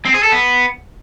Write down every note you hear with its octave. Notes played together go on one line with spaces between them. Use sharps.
C4
G#4
A4
B3